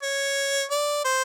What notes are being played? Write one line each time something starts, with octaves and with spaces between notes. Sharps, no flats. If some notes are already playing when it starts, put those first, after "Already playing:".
C#5
D5
C5